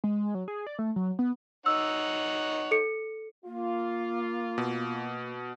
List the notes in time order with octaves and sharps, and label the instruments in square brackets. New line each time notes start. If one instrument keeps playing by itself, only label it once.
[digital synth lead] G#3
F#3
G#4
D5
A3
F#3
B3
[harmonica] D#4 C#5 F#5 [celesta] E6
[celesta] A4 C#7
[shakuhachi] A#3 [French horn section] F4
[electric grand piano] B2